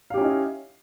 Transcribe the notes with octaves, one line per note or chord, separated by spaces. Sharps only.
C#4 E4 G4 D#5 F5